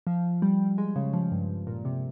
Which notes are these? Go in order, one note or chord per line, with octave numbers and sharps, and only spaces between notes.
F3
G3
G#3
C#3
F3
G2
A#2
C3